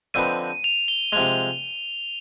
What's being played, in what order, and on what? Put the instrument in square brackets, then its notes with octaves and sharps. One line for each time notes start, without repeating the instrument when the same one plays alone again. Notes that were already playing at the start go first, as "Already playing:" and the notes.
[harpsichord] D3 F3 C4 D#4 B4 [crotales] D#7
[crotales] F7
G7
[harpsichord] C3 F3 G#3 [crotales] F7